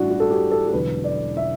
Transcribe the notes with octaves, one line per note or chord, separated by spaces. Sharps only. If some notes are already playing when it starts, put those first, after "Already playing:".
Already playing: A1 G2 E3 D4 E4 F#4
F#4
A4
G4
A4
A4
E1 E2 D3 F#3 B4
D5
E5